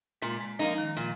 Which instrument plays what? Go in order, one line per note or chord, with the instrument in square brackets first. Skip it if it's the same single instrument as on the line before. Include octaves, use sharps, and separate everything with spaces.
[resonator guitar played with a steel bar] A#2 [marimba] G#3
[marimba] G#3
[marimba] F3 [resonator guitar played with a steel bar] A#3 D#4
[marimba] D#3
[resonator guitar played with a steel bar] A#2 [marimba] F3